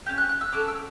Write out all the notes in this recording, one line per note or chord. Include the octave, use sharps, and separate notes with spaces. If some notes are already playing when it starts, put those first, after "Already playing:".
C#4 G4 G6
F#6
F#6
E6
C#4 F#4 A4 D6
E6